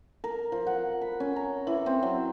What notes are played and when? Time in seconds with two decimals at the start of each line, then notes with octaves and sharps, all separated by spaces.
0.24 A#4
0.52 F3
0.67 F#5
1.01 B5
1.20 C#4
1.36 A#5
1.67 E3
1.86 C4
2.03 F#3